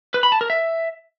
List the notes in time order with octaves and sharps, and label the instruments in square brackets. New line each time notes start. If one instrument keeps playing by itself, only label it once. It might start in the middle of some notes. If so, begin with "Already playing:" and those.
[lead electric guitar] B4
B5
A5
A#4
E5